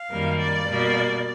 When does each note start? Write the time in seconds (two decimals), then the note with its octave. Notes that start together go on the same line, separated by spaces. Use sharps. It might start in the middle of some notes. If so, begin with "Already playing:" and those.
Already playing: F5
0.10 F#2 D#3 G3 A#3
0.39 D5
0.68 B2 G3 A#3